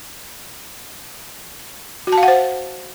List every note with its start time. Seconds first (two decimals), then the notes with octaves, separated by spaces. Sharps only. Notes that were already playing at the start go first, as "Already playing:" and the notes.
2.07 F#4
2.12 A5
2.18 F5
2.23 F#5
2.28 C5